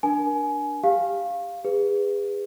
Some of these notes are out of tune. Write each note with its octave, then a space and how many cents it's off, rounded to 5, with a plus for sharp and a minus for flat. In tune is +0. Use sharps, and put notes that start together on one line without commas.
D4 +0 A#4 +25 G#5 +20
G4 +20 F5 +0
G#4 -30 B4 +0